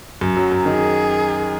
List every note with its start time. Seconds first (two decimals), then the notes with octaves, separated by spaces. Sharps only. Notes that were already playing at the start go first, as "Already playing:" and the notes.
0.21 F#2
0.37 F#3
0.52 F#2
0.65 D#3 G#4